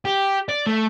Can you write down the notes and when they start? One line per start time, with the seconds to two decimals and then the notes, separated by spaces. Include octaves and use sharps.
0.05 G4
0.49 D5
0.66 A3